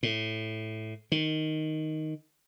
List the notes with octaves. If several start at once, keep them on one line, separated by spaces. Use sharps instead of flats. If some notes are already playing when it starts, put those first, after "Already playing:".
A2
D#3